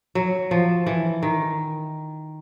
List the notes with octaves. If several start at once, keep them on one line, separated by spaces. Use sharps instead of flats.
F#3
F3
E3
D#3